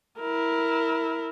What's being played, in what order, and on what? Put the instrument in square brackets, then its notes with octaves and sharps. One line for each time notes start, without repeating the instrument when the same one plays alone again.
[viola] E4 A#4